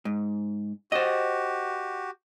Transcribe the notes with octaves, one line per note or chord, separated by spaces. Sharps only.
G#2
F#4 G4 C5 D#5